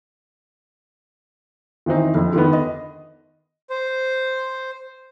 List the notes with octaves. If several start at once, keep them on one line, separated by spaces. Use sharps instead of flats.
D#3 E3 C4 D#4
F2 D3
D3 D#3 B3
D#5
C5